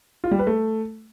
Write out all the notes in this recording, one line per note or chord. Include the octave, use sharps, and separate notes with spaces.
F4
G3
B4
A3